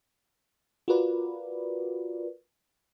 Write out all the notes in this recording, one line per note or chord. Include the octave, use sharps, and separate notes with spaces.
F4 F#4 A#4 B4 D5